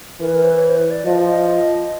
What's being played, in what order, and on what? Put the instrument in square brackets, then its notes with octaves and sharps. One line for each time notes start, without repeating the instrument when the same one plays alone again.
[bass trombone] E3 [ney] A#4
[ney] B4
A#4
C5
B4
C#5
C5
B4
D5
[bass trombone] F3 [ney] D#5